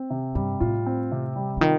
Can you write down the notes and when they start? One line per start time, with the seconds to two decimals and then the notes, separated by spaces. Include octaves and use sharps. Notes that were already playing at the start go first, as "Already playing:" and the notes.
Already playing: C4
0.10 C3
0.35 G2 G3
0.60 A2 F4
0.86 C4
1.12 C3
1.36 G3
1.57 D3
1.61 D#3 F4